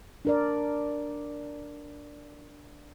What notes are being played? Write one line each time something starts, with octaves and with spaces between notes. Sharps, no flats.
D4 A#4 D5